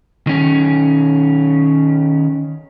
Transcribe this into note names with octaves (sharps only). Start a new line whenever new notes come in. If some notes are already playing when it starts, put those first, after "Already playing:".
D#3 C#4